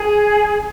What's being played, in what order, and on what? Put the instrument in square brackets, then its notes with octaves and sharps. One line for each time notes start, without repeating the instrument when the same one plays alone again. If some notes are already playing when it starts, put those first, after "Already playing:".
Already playing: [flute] G#4